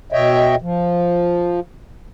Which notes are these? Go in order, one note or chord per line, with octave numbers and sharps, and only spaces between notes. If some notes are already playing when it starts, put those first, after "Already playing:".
B2 C#5 D#5 E5 G5
F3